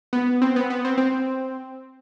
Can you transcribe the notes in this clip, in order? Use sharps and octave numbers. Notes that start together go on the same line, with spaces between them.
B3
C4
B3
B3
C4
C4